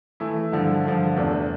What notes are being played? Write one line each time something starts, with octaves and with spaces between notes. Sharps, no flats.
E3 A3 E4
G2 D3 F3
G2 D3 F3
E2 C3 E3 A3 D4